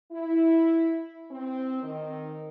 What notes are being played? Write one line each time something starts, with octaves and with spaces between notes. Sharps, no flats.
E4
C4
D#3